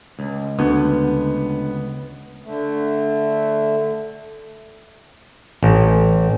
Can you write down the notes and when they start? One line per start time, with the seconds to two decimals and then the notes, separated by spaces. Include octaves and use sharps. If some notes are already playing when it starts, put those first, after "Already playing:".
0.19 C#2
0.59 D2 B3
2.44 D3 A3
5.63 A1